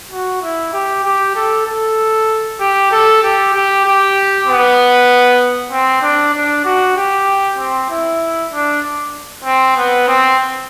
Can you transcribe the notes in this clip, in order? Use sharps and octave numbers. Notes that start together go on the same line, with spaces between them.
F#4
E4
G4
G4
A4
A4
G4
A4
G4
G4
G4
B3
C4
D4
D4
F#4
G4
C4
E4
D4
C4
B3
C4